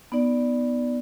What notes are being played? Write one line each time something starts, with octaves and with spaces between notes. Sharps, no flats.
B3 D#4 D5